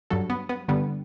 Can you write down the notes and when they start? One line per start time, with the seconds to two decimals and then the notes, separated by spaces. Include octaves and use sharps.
0.10 G2 F#3 A4
0.30 B3
0.49 B3
0.68 G2 D3 G3 B3